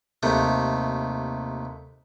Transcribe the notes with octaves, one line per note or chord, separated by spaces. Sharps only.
D#2 C3 A3